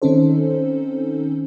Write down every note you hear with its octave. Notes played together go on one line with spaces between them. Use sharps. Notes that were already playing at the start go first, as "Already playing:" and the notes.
D#3 C4 C#4 D#4 A4 C5